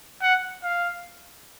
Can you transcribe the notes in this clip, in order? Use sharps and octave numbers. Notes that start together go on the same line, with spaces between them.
F#5
F5